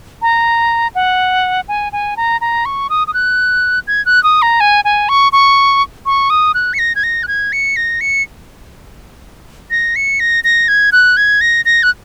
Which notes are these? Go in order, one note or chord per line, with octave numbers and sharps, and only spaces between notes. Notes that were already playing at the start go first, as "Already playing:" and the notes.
A#5
F#5
G#5
G#5
A#5
A#5
C#6
D#6
D#6
F#6
G#6
F#6
D#6
A#5
G#5
G#5
C#6
C#6
C#6
D#6
F#6
C#7
A#6
G#6
A#6
F#6
G#6
C#7
A#6
C#7
A#6
C#7
A#6
A#6
G#6
F#6
G#6
A#6
A#6
F#6